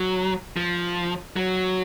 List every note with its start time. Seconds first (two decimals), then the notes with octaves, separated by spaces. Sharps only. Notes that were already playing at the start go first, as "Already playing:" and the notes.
Already playing: F#3
0.57 F3
1.36 F#3